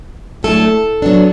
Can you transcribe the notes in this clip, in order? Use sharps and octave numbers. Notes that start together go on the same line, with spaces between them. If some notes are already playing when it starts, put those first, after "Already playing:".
A2 F#3 A3 D4 A4
F#3 B3 D4